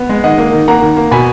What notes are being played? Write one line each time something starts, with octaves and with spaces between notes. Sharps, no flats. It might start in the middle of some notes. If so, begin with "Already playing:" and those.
Already playing: B3
G#3
D#3 D#5 F#5
A#3
D#3
A#3 F#5 A#5
D#3
A#3
B2 G#5 B5